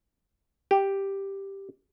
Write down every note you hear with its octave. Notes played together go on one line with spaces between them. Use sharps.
G4